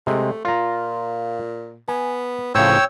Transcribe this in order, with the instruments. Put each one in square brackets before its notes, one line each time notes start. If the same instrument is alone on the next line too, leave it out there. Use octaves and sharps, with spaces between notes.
[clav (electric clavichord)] C3 G#3 [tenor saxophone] A3
[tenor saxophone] A#2 [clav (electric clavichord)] F4 A#5
[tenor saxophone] B3 [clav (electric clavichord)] G#5
[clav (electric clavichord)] A2 C#3 F3 [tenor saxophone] C4 [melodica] C#5 G5 E6